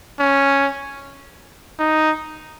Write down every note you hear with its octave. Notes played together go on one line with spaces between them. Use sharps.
C#4
D#4